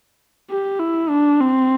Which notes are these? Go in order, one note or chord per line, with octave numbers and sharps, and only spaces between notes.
G4
E4
D4
C4